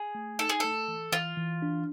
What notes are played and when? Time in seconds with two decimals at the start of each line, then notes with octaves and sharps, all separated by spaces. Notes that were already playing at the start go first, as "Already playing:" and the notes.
Already playing: G#4
0.15 A3
0.39 D#4 A4
0.49 G#4
0.60 A3 A4
0.88 E3
1.12 E3 F4
1.37 E3
1.62 D4